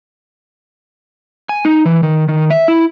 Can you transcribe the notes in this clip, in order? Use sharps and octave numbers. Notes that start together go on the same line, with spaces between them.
G#5
D#4
E3
D#3
D#3
E5
E4